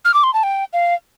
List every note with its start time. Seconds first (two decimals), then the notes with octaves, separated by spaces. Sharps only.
0.05 F6
0.14 D6
0.23 C6
0.34 A5
0.43 G5
0.73 F5